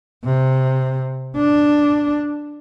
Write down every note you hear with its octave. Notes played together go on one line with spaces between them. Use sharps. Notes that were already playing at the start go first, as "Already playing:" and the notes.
C3
D4